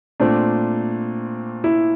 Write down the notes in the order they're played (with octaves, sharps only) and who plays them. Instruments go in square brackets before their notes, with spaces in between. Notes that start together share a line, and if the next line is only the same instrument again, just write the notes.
[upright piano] A#2 A3 C4 D4
E4